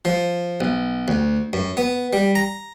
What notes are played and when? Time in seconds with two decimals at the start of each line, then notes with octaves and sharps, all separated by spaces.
0.05 F3
0.61 B1
1.08 D2
1.53 F#2
1.77 B3
2.13 G3
2.35 A#5